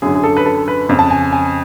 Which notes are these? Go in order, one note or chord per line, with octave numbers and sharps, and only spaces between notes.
F#2 D3 G#4
G#4
A4
B4
A4
B4
F2 C#3
A5
G#5
G#5